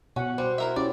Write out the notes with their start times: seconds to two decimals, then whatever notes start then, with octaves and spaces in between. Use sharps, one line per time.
0.16 B2 C#4 F#5
0.38 G3 C5
0.58 E4 A#4 E5
0.76 C#4 E4 G4 D5